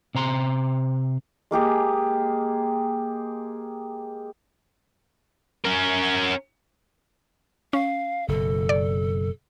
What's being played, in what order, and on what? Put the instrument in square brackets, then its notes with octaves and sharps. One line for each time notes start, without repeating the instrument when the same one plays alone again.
[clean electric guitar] C3 C5 A#5 C6
[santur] G#3 A#3 G4 G#4
[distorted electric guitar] C#4 A#4
[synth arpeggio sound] C#4 [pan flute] F5
[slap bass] F#1 B2 [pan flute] A4
[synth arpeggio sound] D5